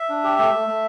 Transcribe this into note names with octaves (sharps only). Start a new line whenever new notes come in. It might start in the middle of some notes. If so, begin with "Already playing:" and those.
Already playing: E5
D4
G4
A3
A3
A3